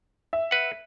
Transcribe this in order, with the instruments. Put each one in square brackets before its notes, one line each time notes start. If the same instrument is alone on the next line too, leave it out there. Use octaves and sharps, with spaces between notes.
[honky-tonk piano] E5
[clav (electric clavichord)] B4 F#5